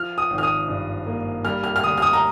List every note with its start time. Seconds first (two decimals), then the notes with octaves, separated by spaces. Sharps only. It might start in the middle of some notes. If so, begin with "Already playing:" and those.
Already playing: F3 F6
0.18 D#6
0.30 G#1
0.38 F6
0.43 D#6
0.68 G2
1.06 A#3
1.45 G3 F6
1.64 F6
1.76 F6
1.83 D2 D#6
1.97 F6
2.02 D#6
2.13 A#5